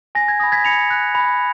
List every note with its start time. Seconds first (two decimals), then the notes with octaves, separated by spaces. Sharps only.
0.15 G#5 A#6
0.28 G#6
0.40 B5 D#6 A#6
0.52 G#6 B6
0.64 B5 C#7 F7
0.90 F#6
1.15 B5